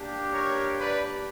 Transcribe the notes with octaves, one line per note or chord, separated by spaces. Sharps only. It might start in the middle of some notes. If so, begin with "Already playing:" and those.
Already playing: A#3 D4 G4
A#4 C#5
B4 D5